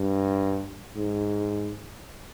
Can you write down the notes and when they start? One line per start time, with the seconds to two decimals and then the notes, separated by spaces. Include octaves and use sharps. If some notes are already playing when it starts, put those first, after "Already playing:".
Already playing: G2
0.96 G#2